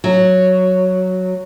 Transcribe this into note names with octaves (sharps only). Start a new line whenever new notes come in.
F#3